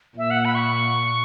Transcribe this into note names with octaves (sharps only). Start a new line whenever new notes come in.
A#2 E5
F#5
B5
C#6